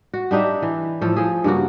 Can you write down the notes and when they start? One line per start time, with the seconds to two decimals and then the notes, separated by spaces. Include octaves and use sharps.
0.14 F#4
0.31 G3 D4 D#4 E5
0.62 E3
1.01 A2 F3 A4
1.16 F3 G#4
1.44 G2 C#3 A#3 F#4